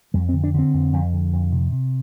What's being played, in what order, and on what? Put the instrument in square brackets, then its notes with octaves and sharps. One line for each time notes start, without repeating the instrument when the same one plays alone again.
[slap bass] F2 G3
C4
D3
D4
D3 C4
F2
F2
D3
F2
C3
C3